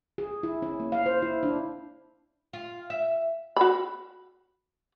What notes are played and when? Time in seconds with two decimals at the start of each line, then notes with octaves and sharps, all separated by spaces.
0.18 G#4
0.43 E4
0.62 C#4
0.80 A#3
0.92 F5
1.06 C5
1.22 E4
1.43 D4
2.53 F4
2.90 E5
3.56 F#4 B5